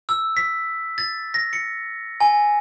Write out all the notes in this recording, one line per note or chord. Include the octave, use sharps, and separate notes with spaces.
E6
B6
A6
A#6
C#7
G#5